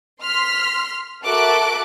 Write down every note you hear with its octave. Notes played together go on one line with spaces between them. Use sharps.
C6 F6 B6
F#4 A4 A#4 E5 D6 F#6